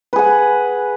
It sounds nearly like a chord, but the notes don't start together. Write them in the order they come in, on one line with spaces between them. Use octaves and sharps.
B4 G#4 F#5